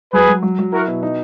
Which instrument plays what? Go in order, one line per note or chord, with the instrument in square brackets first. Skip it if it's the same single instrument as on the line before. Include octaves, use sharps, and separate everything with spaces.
[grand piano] F#3 [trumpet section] G#4 B4
[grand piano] F#3
F#3
F#3
[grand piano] E4 [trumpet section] F#4 A#4
[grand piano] B2
D#4